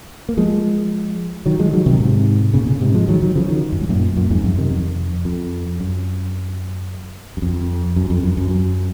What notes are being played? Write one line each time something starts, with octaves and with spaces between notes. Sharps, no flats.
A#3
F3 G#3
D#3 F#3
F3 G#3
D#3 F#3
C3 D#3
G#2 C3
A#2 C#3
A#2 C#3
G#2 C3
F3 G#3
D#3 F#3
D#3 F#3
C#3 F3
D#3 F#3
F#2
G#2
F#2 A#2
F#2 A#2
F2 G#2
F#2
C3 D#3
F2
F2
F#2
F#2
F2
F#2
F2
F#2
F#2
F#2